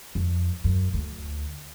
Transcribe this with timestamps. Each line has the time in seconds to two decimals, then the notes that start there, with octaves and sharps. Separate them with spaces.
0.15 F2
0.64 F#2
0.93 D2